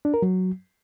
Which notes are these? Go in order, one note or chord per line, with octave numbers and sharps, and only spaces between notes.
D4
A#4
F#3